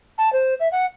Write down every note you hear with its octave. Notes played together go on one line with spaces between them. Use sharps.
A5
C5
E5
F#5